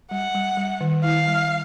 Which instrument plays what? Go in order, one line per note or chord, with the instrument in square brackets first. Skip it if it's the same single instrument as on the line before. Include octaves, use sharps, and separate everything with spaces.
[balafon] G3 [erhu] F#5
[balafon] G3
G3
D#3
[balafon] E4 [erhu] F5
[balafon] G3